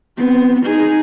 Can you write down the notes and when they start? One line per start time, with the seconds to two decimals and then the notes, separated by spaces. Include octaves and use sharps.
0.17 B3 C4
0.66 D#4 G#4